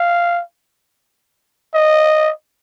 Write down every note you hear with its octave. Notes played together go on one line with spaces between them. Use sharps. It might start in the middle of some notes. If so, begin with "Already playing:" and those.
Already playing: F5
D#5